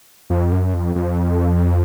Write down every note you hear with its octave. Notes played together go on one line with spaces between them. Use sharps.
F2
F#2
F2
F2